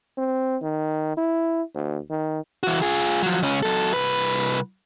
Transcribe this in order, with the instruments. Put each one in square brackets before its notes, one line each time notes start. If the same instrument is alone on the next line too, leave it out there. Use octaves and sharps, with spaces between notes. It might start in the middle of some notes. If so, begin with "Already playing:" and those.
[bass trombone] C4
D#3
E4
D2
D#3
[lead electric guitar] E3 F#4
F4 G#4
F3 F#3
C#2 C#4
F#3 A4
C2 B4